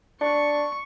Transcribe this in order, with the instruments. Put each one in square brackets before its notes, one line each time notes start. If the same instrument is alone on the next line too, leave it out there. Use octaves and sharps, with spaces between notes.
[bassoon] D4 [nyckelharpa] C#6